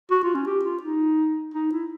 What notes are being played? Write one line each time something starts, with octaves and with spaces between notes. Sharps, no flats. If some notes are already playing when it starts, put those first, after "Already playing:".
F#4
F4
C#4
G4
F4
D#4
D#4
E4